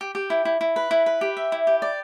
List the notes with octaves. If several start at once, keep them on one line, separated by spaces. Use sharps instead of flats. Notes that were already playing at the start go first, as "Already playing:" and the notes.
G4
G4
E4
E4
E4
B4
E4
B4
G4
E5
E4
G4
D5